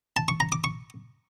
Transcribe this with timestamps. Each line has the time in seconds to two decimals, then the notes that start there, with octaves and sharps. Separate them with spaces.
0.16 A5
0.28 C#6
0.40 A#5
0.52 D6
0.64 C#6